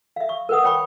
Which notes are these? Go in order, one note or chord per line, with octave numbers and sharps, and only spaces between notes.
E5 F5
C#6
A#4 B4 F#5 D#6
C#5 G5 B5 C#6